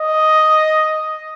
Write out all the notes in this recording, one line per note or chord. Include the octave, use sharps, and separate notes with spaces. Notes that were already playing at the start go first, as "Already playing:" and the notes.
Already playing: D#5